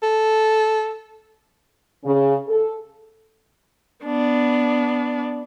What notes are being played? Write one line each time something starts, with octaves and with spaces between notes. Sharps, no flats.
A4
C#3
A4
B3 D4